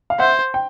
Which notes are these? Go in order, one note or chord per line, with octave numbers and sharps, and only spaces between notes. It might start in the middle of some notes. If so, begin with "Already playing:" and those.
F5
C5 E5 F#5
G5